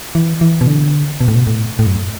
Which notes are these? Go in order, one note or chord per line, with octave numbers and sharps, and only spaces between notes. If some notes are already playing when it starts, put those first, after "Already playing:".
E3
E3
B2
D3
B2
A2
B2
A2
A2
F#2